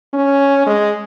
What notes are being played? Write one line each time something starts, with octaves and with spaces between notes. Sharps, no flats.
C#4
G#3